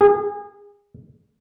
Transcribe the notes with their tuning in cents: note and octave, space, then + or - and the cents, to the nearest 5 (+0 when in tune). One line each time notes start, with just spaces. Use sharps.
G#4 -30